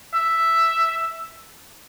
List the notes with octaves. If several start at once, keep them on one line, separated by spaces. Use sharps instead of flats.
E5